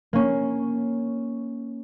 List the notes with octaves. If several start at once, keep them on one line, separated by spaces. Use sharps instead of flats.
A#3 C#4